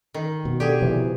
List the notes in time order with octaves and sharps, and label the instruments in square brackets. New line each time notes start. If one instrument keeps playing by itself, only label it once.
[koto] D#3
[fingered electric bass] B2
[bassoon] D3 [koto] G4 G#4
[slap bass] C3 F3 [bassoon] E3